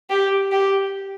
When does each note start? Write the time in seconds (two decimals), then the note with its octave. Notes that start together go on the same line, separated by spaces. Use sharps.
0.10 G4
0.52 G4